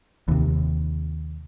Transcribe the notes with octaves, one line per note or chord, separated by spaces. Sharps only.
D#2 C3